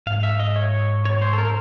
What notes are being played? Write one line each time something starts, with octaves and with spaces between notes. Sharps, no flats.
G#2 F5
E5
D#5
C#5
C#5
C5
A4
A#4